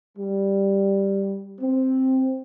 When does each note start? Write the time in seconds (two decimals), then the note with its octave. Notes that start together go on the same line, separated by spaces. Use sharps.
0.17 G3
1.60 C4